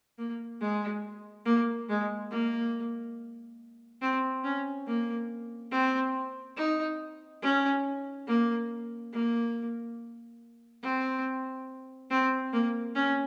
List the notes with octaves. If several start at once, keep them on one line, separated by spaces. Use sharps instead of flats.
A#3
G#3
A#3
G#3
A#3
C4
C#4
A#3
C4
D#4
C#4
A#3
A#3
C4
C4
A#3
C#4